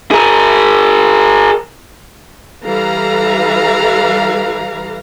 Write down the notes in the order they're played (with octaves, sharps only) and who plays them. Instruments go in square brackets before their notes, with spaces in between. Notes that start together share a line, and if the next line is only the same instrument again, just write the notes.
[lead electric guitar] G#4 A#4
[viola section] E3 G3 A4 B4 F5 A#5